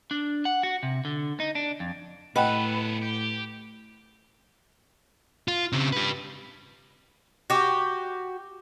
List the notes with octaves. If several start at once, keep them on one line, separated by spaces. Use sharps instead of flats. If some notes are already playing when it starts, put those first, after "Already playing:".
D4
F#5
F#4
C3
D3
D#4
D4
F2
A2 B3 A4 B4 D#5 F#5 G5
G4
F4
C#3 C4
G4 B4
F#4 G4